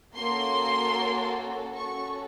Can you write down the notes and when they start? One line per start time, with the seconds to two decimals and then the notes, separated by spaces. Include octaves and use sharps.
0.15 A#3 C#4 F#4 A4 C6
1.76 C#4 F#4 A4 C#6